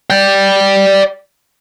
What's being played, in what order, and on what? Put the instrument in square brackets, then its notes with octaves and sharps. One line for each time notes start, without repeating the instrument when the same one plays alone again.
[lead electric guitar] D5 G5